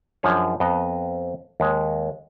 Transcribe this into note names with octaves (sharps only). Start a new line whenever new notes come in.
F#2 F3 D4 G#4 C#5
F2 B3 D#5
D#2 G#3